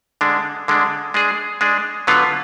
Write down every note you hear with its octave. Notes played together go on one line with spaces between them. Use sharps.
D3 G#3 D4
D3 G#3 D4
G#3 D4 G#4
G#3 D4 G#4
D3 F#3 B3 F4